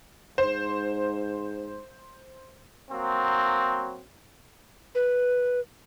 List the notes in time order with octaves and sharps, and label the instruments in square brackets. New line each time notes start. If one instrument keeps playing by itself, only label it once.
[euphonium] G#2 [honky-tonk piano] C5
[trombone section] F#3 A#3 C4
[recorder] B4